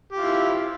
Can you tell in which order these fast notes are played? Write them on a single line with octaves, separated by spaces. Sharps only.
G4 F4 E4